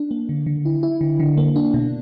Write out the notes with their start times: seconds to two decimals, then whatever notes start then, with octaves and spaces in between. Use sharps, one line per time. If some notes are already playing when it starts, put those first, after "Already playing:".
Already playing: D4
0.11 A#3
0.29 D3
0.46 D3
0.65 E4
0.83 E4
1.01 D3
1.20 D3
1.37 A#3
1.56 D4
1.74 B2